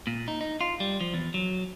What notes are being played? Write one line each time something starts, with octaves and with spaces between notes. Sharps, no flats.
A#2
D#4
D#4
F4
G3
F3
E2
F#3